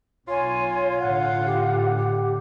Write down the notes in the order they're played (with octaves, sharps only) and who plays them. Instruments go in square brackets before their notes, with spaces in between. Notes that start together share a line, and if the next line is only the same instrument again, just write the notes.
[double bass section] B1 [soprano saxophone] F4 [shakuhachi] C#5 [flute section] G#5 C6
[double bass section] A2 D3 [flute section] F#5
[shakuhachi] G4
G4